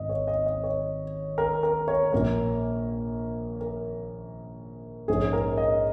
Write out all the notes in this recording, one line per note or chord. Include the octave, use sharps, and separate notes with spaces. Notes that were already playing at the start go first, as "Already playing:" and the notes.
Already playing: G#1 G#2 D#5
C#5
D#5
D#5
C#5
A#4
A#4
C#5
A#1 A#2 A#3 A#4
A#4
A#1 G#2 G#3 C#4 G#4
A#4
D#5